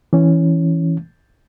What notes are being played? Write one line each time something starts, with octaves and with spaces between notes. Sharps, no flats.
E3 C#4